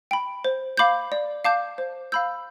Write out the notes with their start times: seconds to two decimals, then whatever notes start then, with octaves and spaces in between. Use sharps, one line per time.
0.11 G5 B5
0.44 C5
0.77 F5 B5 D6 G6
1.12 D5
1.45 F5 A5 D6 G6
1.78 C5
2.12 F5 B5 E6 G6